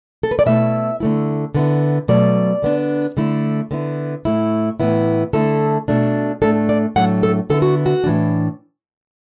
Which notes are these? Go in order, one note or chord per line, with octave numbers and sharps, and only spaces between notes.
A4
B4
D5
B2 A3 E4 E5
D3 A3 E4
D3 B3 E4
B2 F#3 A3 D5
D3 B3 D4
D3 A3 E4
D3 B3 E4
A2 A3 E4
A2 E3 B3 E4
D3 A3 E4 A4
B2 A3 D4
A2 A3 D4 A4
D5
A2 F#3 A3 D4 F#5
A4
D3 B3 E4 A4
F#4
F#4
A2 E3 D4